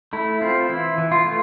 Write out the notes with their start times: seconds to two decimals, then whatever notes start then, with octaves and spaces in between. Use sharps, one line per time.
0.13 A3 E4
0.41 C4 F4
0.69 E3 E4
0.98 E3
1.12 F4
1.25 A3